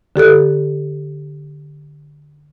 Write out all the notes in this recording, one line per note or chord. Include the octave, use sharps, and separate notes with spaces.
D3 G4 A4 F#6